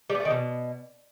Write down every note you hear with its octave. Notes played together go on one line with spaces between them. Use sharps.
G3
B3
A3
D#3
B2